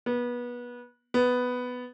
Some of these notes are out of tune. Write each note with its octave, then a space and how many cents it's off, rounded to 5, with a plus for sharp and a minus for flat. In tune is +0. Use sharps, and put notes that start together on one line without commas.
B3 -25
B3 +5